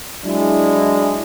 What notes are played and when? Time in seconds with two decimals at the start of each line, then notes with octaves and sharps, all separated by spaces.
0.24 F#3 G#3 D4 E4